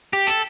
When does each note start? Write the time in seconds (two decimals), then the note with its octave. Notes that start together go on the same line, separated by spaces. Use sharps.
0.13 G4
0.27 A4